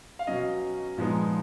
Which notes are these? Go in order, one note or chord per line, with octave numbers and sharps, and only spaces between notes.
F5
B2 F#3 C#4 D#5
A#2 F3 G#3 B3 D#4